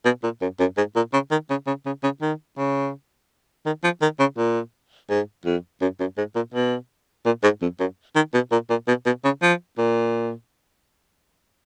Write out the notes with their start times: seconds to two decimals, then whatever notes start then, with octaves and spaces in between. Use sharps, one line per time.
0.05 B2
0.23 A#2
0.41 F#2
0.60 F#2
0.77 G#2
0.96 A#2
1.13 C#3
1.31 D#3
1.50 C#3
1.67 C#3
1.86 C#3
2.03 C#3
2.22 D#3
2.57 C#3
3.66 D#3
3.84 F3
4.02 D#3
4.20 C#3
4.38 A#2
5.10 G#2
5.45 F2
5.81 F#2
6.00 F#2
6.18 G#2
6.36 A#2
6.54 B2
7.26 A#2
7.43 G#2
7.62 F2
7.80 F#2
8.15 D#3
8.34 B2
8.52 A#2
8.70 A#2
8.88 B2
9.06 B2
9.24 C#3
9.42 F3
9.78 A#2